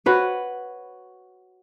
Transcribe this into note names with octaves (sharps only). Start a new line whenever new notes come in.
F#4 B4 C#5